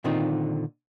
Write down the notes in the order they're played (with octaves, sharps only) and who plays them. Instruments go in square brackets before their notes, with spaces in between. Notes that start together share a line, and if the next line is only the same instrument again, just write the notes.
[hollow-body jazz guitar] A#2 D3 D#3 C4 D#4 F4